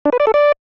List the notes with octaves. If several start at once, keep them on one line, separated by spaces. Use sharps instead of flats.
D4
B4
D5
A4
D5